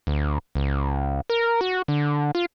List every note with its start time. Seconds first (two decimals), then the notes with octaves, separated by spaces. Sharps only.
0.07 D2
0.55 C#2
1.30 A#4
1.61 F#4
1.88 D3
2.35 F4